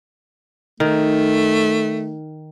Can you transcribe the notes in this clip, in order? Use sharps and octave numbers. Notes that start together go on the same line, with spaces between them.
D#3 A3